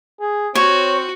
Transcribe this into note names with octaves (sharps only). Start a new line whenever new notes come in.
G#4
C4 F#4 C#5